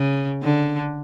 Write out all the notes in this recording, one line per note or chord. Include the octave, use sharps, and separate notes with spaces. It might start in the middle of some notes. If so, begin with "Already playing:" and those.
Already playing: C#3
D3